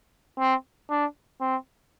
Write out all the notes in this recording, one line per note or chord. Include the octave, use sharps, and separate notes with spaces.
C4
D4
C4